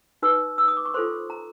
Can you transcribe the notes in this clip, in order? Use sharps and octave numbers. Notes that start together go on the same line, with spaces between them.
D#4 F#4 B4 E6
E6
D#6
D6
C#6
F4 A4 C5 C6
A#5